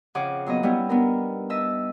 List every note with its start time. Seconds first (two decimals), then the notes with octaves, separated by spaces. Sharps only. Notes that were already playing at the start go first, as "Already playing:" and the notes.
0.15 F2 C#3 G#4 F#5 D6
0.46 A#2 F#3 B3 D#5
0.63 G3 B3 C#4 E4
0.89 B3 D4 D#4 A#4
1.50 D#5 E5 A5 E6